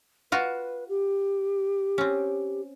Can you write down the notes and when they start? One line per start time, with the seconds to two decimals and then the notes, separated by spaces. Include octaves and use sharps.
0.32 F4 F#4 B4
0.89 G4
1.98 C4 C#4